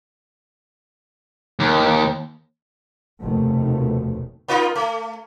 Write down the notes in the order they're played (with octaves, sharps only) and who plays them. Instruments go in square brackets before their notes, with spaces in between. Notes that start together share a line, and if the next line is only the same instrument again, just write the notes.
[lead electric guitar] D#2
[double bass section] F1 D#2 B2 D#3 A3
[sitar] A#3 D#4 F4
A3